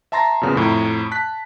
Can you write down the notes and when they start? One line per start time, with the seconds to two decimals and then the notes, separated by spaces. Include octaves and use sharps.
0.12 E5 A5 A#5 C6 A6 A#6
0.41 F#2 A#2 C#3 B3
0.55 F2 A2 A#5
1.11 A5 F#6 B6